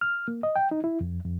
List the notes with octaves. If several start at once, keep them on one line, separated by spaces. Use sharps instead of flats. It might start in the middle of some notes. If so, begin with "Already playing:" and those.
F6
A#3
D#5
G5
D#4
E4
F2
F2